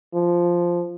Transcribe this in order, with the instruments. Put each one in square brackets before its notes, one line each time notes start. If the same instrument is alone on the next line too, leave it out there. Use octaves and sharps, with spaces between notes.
[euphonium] F3